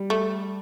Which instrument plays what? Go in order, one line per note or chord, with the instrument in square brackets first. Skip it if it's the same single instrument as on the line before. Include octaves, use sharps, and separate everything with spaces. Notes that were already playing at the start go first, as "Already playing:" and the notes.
Already playing: [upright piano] G3
[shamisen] A3